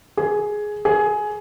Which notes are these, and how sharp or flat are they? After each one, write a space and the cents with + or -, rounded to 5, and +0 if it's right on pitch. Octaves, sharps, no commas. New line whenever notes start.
G#4 +10
G#4 +15